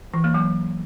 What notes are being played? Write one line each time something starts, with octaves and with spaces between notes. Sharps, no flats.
E3
A#3
F#3